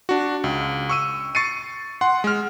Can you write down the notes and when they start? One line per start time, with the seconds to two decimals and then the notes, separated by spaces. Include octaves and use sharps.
0.09 D4 F#4
0.44 C#2
0.89 C#6 E6 D#7
1.35 C#6 A6 C7 C#7 D#7
2.01 F#5 C6
2.24 G#3 F6